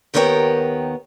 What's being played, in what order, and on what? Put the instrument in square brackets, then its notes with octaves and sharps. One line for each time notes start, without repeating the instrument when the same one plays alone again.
[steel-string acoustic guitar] D#2 D#3 B3 A#4 C#5 G5